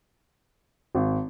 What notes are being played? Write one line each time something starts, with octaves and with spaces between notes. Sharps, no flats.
G#1